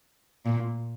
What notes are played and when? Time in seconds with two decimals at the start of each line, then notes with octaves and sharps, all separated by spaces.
0.46 A#2